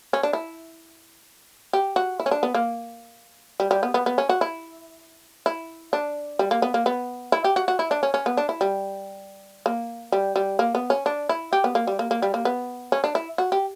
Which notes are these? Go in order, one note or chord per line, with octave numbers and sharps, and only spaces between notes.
C#4
D4
E4
G4
F#4
E4
C#4
D4
B3
A#3
G3
G3
B3
B3
B3
C#4
F#4
E4
E4
D4
G3
A#3
B3
A#3
B3
E4
G4
F#4
F#4
E4
D4
C#4
C#4
B3
D4
E4
G3
A#3
G3
G3
A#3
B3
C#4
D4
E4
G4
B3
A#3
G3
A#3
A#3
G3
A#3
B3
C#4
D4
E4
F#4
G4